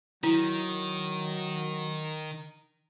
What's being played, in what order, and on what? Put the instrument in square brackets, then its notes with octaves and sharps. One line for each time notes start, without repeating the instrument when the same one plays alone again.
[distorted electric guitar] D#3 [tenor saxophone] F#3 [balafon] E4